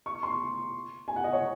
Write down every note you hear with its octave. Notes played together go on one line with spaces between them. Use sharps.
C#6
C6
G#5
F#5
D#5
C#5